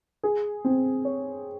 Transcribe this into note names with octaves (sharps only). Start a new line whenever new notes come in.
G#4
C4
C#5